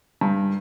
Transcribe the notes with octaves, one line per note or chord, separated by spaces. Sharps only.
G2